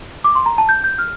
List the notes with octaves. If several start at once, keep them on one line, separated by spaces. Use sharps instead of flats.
D6
C6
A#5
A5
G6
G6
F6